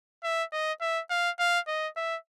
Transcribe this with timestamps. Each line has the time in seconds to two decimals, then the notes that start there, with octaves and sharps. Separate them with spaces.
0.23 E5
0.52 D#5
0.81 E5
1.10 F5
1.39 F5
1.68 D#5
1.97 E5